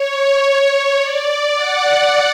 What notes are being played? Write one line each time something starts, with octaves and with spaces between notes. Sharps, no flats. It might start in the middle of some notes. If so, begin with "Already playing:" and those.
Already playing: C#5
D5
F#5